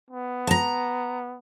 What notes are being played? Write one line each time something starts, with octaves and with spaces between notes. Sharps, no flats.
B3
A5 A#5